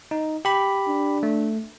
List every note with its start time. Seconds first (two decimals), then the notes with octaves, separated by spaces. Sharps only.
0.11 D#4
0.45 G4 B5
0.89 D4
1.23 A3